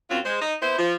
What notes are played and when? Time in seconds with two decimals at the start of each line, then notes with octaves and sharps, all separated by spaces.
0.10 F#2 F#3 C4 F4
0.26 G#3 C5
0.41 D#4
0.62 B3 E4 C5
0.79 F3